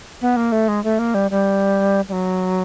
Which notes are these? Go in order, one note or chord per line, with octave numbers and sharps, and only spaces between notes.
B3
A#3
A3
G#3
A3
A#3
G3
G3
G3
F#3